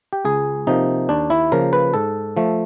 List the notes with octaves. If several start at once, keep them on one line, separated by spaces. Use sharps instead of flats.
G4
C#2 G#4
C3 F3 A#3 D#4
D#2 D4
E4
C#3 F3 A#3 A#4
B4
G#2 A4
F3 A3